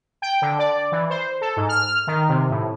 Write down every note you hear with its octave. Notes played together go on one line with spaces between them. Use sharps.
G5
D3
D5
E3
C5
A4
G#2
F6
D#3
C3
A2